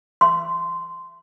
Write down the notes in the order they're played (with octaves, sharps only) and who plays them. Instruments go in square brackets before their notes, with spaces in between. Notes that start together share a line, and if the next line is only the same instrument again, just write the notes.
[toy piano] C6